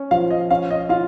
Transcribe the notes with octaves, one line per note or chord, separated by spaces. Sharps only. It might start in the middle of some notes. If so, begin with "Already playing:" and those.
Already playing: C#4
F3 F5
D#5
C#4 F5
D#5
F4 F5